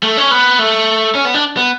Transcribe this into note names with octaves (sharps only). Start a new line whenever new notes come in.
A3
C#4
B3
A3
C#4
B3
D4
B3